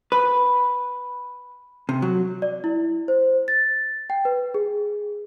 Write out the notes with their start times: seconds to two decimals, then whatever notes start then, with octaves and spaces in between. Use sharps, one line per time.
0.12 B4
1.89 C3
2.02 F#3
2.42 D5
2.64 E4
3.08 C5
3.48 A6
4.10 G5
4.25 B4
4.54 G#4